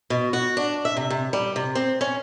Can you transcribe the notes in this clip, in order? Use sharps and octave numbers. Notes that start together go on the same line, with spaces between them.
B2
F#4
D4
E5
C3
C3
G3
C3
C4
C#4